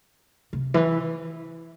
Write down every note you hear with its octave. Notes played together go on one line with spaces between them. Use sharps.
C3
E3